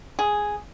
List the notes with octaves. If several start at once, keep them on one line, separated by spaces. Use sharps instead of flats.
G#4